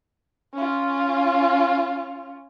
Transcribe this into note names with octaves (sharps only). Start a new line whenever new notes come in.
C#4 F4